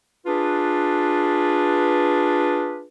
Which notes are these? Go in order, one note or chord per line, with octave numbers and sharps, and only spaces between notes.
D4 F4 G#4 B4